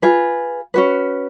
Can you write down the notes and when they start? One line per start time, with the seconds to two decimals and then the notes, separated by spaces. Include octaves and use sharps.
0.02 F4 G#4 B4
0.74 C#4 F#4 B4